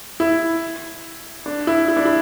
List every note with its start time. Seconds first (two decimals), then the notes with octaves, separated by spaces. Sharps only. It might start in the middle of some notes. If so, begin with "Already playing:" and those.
0.20 E4
1.46 D4
1.67 E4
1.88 E4
1.97 D4
2.05 E4